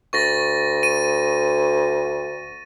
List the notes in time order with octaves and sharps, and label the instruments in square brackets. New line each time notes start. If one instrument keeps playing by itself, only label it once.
[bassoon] D2 [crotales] C#6 A6 A#6
[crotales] D#7